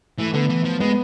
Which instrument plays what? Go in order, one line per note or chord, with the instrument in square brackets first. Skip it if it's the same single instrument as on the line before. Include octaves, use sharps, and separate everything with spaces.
[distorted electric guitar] E3 [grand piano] A3
[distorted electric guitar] D3 [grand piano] B3
[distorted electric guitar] E3
F3
[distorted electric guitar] G#3 [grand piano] B3